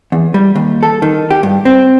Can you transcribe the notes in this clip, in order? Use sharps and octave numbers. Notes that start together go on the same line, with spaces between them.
E2
G3
D#2
A4
D#3
G4
G2
C4